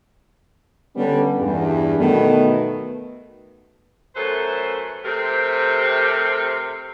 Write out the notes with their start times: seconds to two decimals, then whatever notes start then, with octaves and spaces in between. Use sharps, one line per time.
0.96 D3 G3 B3 C#4 B4
1.39 E2 G2
1.98 B2 D#3 A3 B3
4.15 F#2 A3 B4 C5
5.04 C3 A3 C4 G4 A#4